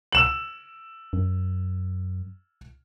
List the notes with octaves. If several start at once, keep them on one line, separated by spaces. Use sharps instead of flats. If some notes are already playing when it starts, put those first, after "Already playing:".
E6 E7 F#7
F#2